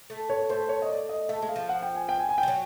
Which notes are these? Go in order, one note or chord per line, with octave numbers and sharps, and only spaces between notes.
A3
C#5
A3 C5
C#5
D#5
D5
D#5
A3 E5
G#3
F5
F3
F#5
G5
G#5
G5
G#5
G#5
G5
G3
F#3